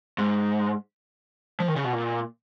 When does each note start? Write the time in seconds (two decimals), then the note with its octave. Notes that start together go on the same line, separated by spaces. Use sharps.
0.18 G#2
1.60 F3
1.68 D#3
1.76 C#3
1.84 B2
1.93 A#2